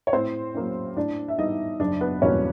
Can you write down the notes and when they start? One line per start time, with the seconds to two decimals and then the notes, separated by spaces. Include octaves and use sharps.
0.07 C#5
0.13 A2 C4 C5
0.55 F#3 A#3 C#4
0.96 A2 D4 D5
1.28 E5
1.38 E3 G3 B3 D#4 D#5
1.80 F#1 D4 D5
2.01 B3 B4
2.22 E2 B2 G3 A#3 C#4 C#5